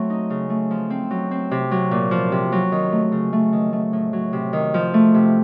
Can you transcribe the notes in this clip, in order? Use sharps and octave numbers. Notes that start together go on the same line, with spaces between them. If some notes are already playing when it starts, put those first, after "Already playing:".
Already playing: F#3 A3 C4
D#4
C#3
A3
F3
C4
F#3
C4
C3
F#3
A#2
F3
C3
F#3
D#3
A3
C#3
A3
D#3
A3
A2
F#3
C3
D#3
F3
A3
C3